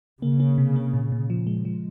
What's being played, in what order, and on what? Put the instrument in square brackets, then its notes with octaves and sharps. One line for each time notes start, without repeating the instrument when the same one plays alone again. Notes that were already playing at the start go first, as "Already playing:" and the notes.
[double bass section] C#3 [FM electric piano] A#3
[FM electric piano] A#3
C3
A#3
A#2
A#2
F3
G#3
F3